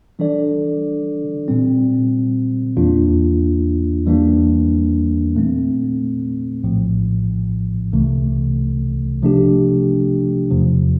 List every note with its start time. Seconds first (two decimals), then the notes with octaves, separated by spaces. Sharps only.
0.19 E3 G3 D4 A4 D5
1.48 A#2 G3 C4
2.77 E2 E3 A#3 D4 F4
4.06 E2 E3 G3 A#3 D4
5.35 A#2 A3 C4
6.64 A#1 A2 F3
7.92 C2 C3 E3 A3
9.22 C3 F3 A3 D4 G4
10.51 E2 C3 F3